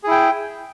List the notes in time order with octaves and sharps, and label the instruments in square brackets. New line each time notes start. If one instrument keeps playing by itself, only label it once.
[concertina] G#4
E4
G5